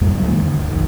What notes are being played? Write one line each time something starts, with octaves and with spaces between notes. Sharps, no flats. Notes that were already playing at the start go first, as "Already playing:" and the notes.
F2 A2 G3 B3
C#2 G2 F#3
A1 D#3 G#3 A#3
E2 G2 D3 D#3
D1
B1 F2 D#3